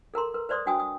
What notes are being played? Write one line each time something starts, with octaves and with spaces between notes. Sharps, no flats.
A4 A#4 A#5 C6
A#4 B4
B4 C5 D5 C6 D#6
D4 F#4 G5 G#5 D#6
D#6